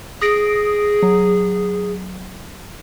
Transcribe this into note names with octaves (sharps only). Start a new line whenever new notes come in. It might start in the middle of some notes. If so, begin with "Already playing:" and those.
G#4 D#6 A#6 D7
F#3